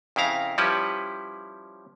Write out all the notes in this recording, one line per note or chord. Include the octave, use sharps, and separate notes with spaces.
F2 C#3 E4 F5 A#5
F3 G3 C#4 E4 G4 B4